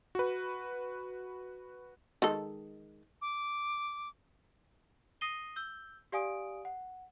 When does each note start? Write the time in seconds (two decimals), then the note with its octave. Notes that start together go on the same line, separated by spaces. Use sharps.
0.15 F#4 B4
2.22 D#3 G#3 A4
3.22 D6
5.21 D#6 A#6 C7 D#7 G7
5.56 E6 G6 G7
6.12 G4 D5 F5 G#5 D#6 D7
6.65 F#5